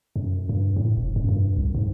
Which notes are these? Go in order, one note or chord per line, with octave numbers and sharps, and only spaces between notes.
F#2
G2
A2
E1
F#2
G2
C2
G#2